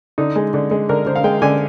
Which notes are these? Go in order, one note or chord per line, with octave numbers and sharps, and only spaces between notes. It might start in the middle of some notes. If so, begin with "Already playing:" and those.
D3 D#4
G#3
D3
G#3
D3 A#4
D3 C5
F5
G#3 G5
D3 G#5